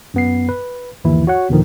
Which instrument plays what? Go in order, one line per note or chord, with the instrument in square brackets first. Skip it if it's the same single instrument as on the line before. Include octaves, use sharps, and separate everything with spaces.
[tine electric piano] F#2 B3 C7
B4
G1 D#2 E3 E4
F#4 C#5 F#5
D#2 A#2 D3 D#3 F3